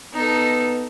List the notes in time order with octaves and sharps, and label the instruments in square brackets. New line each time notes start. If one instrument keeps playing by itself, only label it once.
[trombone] B3 [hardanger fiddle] D#4 A4